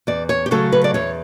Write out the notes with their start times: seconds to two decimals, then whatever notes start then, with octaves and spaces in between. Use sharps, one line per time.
0.07 E2 D5
0.29 C#5
0.46 G4
0.51 C#3 F#3 A3 A4
0.72 B4
0.84 D5
0.94 E2 C#5